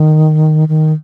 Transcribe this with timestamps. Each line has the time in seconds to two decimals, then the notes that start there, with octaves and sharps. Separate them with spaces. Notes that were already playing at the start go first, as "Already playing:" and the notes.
Already playing: D#3
0.68 D#3